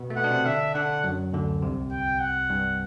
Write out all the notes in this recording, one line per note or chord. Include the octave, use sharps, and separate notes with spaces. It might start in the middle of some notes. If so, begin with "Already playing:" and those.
Already playing: B2 B3
A3
B2 B3 F#5
D4
C3 C4
D3 D4 E5
D3 D4 F#5
F#2 F#3
D2 D3
C2 C3
G5
F#5
G2 G3